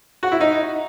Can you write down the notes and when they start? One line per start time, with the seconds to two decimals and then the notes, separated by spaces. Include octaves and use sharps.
0.23 F#4
0.32 E4
0.41 D#4